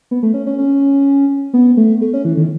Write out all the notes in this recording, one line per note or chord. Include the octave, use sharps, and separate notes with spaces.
B3
A3
C#4
C#4
C#4
B3
A3
A3
C#4
E3
D#3